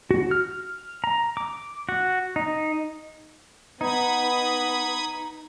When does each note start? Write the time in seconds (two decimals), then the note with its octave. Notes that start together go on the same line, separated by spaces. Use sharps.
0.11 F#4
0.31 F6
1.04 A#5
1.37 D6
1.89 F#4
2.36 D#4
3.81 B3 D#4 B5 D#6 G#6